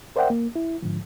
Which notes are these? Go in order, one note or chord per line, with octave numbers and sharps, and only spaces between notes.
A#4 C5 D5 E5 F#5 G5
A#3
E4
G#2 D3 F3